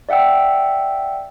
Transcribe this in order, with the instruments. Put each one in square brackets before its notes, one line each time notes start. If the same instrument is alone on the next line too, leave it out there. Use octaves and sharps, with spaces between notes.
[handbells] D5 E5 F#5 G5 E6